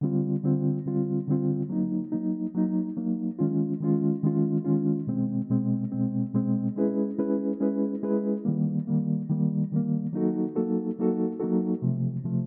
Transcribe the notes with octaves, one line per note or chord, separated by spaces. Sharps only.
D3 G3 C4 F4
D3 G3 C4 F4
D3 G3 C4 F4
D3 G3 C4 F4
F#3 A#3 D#4
F#3 A#3 D#4
F#3 A#3 D#4
F#3 A#3 D#4
D#3 G#3 C#4 F4
D#3 G#3 C#4 F4
D#3 G#3 C#4 F4
D#3 G#3 C#4 F4
B2 G#3 C4
B2 G#3 C4
B2 G#3 C4
B2 G#3 C4
G#3 C#4 E4 G#4 B4
G#3 C#4 E4 G#4 B4
G#3 C#4 E4 G#4 B4
G#3 C#4 E4 G#4 B4
D#3 G3 A#3
D#3 G3 A#3
D#3 G3 A#3
D#3 G3 A#3
F#3 A#3 D#4 F#4 A4
F#3 A#3 D#4 F#4 A4
F#3 A#3 D#4 F#4 A4
F#3 A#3 D#4 F#4 A4
C3 F3 A3
C3 F3 A3